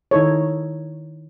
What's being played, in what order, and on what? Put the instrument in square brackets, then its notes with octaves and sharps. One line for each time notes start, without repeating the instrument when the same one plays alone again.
[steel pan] D#3 D#4 E4 A4 C#5